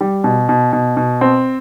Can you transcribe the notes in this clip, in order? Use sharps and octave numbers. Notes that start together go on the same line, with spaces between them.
G3
B2
B2
B2
B2
C4